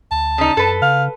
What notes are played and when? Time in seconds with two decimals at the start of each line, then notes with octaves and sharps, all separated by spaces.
0.11 D2 A5
0.38 C#3 D#4
0.57 F#2 A4 B4
0.82 C#3 F5